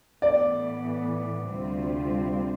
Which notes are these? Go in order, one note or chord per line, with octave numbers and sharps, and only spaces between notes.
A2 E3 B3 D5
D2 C3 G3 C4 F4